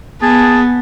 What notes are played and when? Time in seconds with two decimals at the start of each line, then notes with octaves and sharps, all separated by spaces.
0.22 B3 G#4 A5